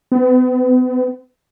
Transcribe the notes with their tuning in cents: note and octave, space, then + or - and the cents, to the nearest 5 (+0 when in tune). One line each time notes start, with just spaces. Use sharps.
B3 +45